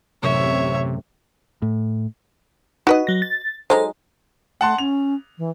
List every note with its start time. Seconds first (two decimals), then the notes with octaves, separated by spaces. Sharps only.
0.23 A1 F#2 C3 A3 C#5 E5
1.62 A2
2.87 D#4 F#4 B4 D#5
3.07 F#3 A#6
3.22 A6
3.70 F#3 G#3 D#4 A4 C5
4.61 A3 F#5 A5 C6
4.78 C#4 F7
5.38 E3